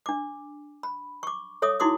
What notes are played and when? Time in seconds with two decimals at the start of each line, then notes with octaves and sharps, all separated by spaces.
0.06 D4 D6
0.83 B5
1.23 C#6 D6
1.62 A4 C#5 E5 D6 D#6
1.80 D#4 E4 F#4 C6 D6 D#6